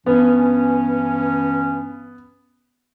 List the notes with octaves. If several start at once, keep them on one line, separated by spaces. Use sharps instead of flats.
G2 E3 B3 C#4